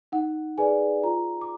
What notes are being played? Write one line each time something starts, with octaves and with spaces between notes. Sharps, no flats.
D#4 F#5
G#4 B4 D5 G#5
F4 A#5
D6